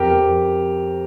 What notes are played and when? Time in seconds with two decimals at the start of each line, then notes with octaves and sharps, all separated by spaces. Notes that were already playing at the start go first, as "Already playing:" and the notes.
Already playing: F2 G4 A#4
0.12 F2